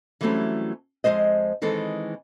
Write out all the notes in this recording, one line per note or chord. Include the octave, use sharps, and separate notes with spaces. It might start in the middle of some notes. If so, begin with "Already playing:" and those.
E3 F#3 G3 A3 C4 C#4
F2 D#3 G#3 C5 D#5
D#3 E3 G#3 C4 A4